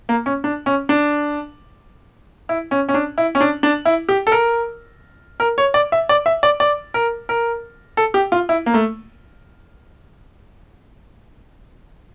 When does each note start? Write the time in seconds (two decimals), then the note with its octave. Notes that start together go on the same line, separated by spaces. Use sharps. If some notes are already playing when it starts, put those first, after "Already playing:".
0.09 A#3
0.26 C#4
0.44 D4
0.66 C#4
0.89 D4
2.49 E4
2.71 C#4
2.89 C#4
2.94 D4
3.18 E4
3.35 C#4
3.41 D4
3.63 D4
3.85 E4
4.09 G4
4.27 A4
4.32 A#4
5.40 A#4
5.58 C#5
5.74 D5
5.92 E5
6.09 D5
6.26 E5
6.43 D5
6.60 D5
6.94 A#4
7.29 A#4
7.97 A4
8.14 G4
8.32 F4
8.49 E4
8.66 A#3
8.74 A3